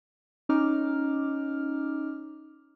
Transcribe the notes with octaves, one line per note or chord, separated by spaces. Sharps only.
C#4 D#4 D6 F6